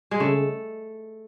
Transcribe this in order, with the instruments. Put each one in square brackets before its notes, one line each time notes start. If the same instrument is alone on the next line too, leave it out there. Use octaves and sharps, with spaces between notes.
[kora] G#3
[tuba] C#3 [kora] A3